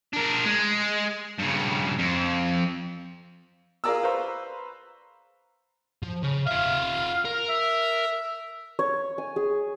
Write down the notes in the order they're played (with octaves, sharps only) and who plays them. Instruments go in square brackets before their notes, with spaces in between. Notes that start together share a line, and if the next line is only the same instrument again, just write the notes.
[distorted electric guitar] D4 A#4
G#3
G2 C#3
F2
[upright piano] F4 G#4 A#4 D5 A#5 E6
B4 C5 F5 A#5 C#6 E6
[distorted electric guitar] F3
C#3
[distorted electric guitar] F4 E5 [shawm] F5
[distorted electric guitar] A#4
[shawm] E5
[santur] C#5
G#5
G#4